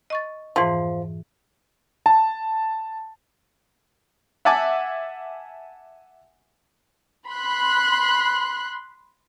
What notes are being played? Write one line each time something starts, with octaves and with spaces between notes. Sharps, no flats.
D#5 C#6 A6
F2 G#2 E3 F3
A5
E5 F#5 G#5 A5 D6
B5 C6 F#6